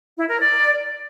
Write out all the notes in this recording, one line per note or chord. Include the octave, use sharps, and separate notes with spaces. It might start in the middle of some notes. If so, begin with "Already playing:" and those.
E4
A#4
D5